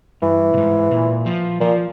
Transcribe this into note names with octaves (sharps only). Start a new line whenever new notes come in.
G2 E3
A#2
G#2
A#2
F3
A#2 F3